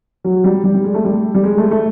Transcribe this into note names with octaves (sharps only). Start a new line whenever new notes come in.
F#3
G3
G3
G3
G#3
A3
G3
G3
G#3
A3
A3